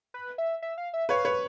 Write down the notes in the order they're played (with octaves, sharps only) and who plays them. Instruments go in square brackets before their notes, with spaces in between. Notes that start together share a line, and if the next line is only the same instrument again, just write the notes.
[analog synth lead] B4
E5
E5
F5
E5
[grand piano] B4 C#5 [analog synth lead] F5
[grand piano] B4 C#5